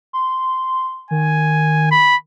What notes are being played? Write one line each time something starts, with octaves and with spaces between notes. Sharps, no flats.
C6
D#3 G#5
B5